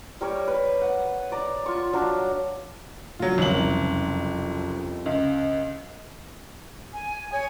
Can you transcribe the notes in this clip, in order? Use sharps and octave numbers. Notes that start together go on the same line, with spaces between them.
G3 A#4 C#5
B4
F#5
D5 A#5
F4 C#6
F#3 D4 F5 A#5
A#1 F#3 F4
F#1 C2 F2 F#7
C#2
G#5
C#5 G#5